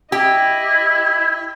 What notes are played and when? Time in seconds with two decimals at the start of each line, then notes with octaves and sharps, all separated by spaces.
0.12 E4 G4 D#5